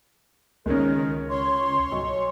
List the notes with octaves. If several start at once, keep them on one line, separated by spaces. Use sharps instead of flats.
C#2 D#3 G#3 C#4 A#4
C#5 C6
B1